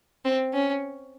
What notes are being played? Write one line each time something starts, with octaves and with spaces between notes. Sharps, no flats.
C4
C#4